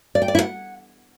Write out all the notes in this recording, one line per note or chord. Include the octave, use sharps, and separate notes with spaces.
D5
G5
D5
E4
F#5